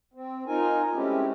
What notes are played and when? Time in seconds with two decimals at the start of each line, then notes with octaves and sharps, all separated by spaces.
0.14 C4
0.47 D#4 F4 A#4 G#5
0.94 G#3 A3 C4 C#4 E4 G4